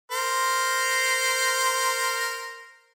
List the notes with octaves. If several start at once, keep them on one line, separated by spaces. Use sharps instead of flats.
A#4 C5